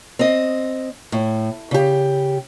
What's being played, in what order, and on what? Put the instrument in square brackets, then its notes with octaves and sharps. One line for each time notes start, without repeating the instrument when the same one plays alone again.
[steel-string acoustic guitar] C4 D#5
A2
C#3 G4